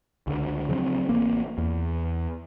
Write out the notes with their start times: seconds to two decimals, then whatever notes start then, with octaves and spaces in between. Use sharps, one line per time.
0.27 C#2 D3
0.69 C#3 F3 F#3 C4
1.09 A1 A#3 C4
1.58 E2